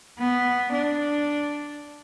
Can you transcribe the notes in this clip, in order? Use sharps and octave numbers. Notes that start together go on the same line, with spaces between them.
B3
D4